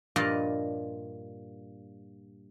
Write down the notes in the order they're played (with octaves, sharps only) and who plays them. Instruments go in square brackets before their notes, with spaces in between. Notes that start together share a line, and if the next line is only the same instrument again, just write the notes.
[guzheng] G2 A#2 F3 D5 D#5 F5